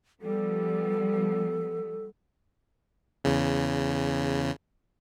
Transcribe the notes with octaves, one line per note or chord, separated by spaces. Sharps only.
F3 G3 B3 A4
E2 C#3